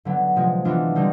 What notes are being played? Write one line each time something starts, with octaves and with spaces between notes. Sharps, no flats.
D3 F#3 B3
C3 F3 G#3
E3 G#3 B3 D4 F4
D3 G3 C4 D#4